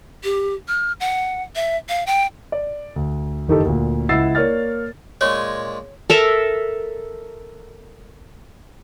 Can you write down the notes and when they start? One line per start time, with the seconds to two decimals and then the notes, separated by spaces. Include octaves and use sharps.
0.23 G4
0.68 F6
1.00 F#5
1.55 E5
1.89 F5
2.06 G5
2.52 D5
2.96 D2
3.48 F#1 D#3 D#4 G4 A4
3.65 D2 A#2
4.09 C#2 E4 F#5 E6 A6 C7
4.35 A#3 C#5 D5 F6 A6
5.21 A#2 G#3 C#4 C#5
6.10 A4 A#4 E5